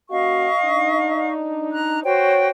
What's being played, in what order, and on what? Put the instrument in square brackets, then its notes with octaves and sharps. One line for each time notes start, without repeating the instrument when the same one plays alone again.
[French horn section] A#3 C#4 F#4 [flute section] D#5 F5 C#6
[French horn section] D4 D#4
[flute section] A#5 F#6
[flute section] F#4 C5 G5 [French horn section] C#5